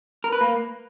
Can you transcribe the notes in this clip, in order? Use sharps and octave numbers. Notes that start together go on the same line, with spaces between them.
A#4
B4
A#3